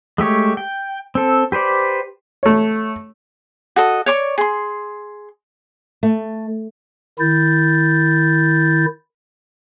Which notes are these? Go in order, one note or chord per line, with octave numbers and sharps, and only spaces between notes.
G#3 A3 G4 C#5
G5
C4 A4
G4 B4 C5 D5
A3 C#5
F#4 A4 D#5
C#5 D5 C#6
G#4 C6
A3
D#3 E4 G6 A6